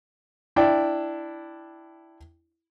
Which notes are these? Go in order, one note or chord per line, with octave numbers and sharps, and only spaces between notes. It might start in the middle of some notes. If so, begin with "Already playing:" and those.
D4 E4 D5 G5